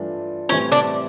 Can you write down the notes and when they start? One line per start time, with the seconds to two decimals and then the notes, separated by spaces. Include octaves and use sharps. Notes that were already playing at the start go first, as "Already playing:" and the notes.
Already playing: G2 E3 A3 D4 F4
0.49 A2 E3 G3 C4 C#4 E4
0.72 D4